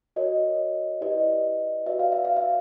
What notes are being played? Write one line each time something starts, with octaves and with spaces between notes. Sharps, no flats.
F#4 A#4 C#5 D#5
E4 G4 B4 D5 D#5
F#4 B4 D5 E5
F5
E5
F5
E5